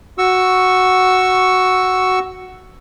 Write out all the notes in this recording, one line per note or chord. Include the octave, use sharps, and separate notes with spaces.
F#4 C#6 E6